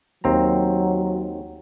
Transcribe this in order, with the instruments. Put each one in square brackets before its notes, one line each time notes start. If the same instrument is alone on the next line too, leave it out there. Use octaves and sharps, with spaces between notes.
[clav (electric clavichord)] D#2 C4 A#5 [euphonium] F#3